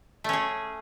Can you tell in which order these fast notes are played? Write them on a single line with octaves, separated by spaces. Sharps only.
A3 C#4 G#4